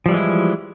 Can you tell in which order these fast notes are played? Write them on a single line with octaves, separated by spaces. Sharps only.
F3 G3 E3 G#3 E4